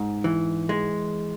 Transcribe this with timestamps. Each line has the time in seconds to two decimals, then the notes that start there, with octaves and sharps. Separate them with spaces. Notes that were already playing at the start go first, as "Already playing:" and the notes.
Already playing: G#2
0.24 E3
0.69 G#3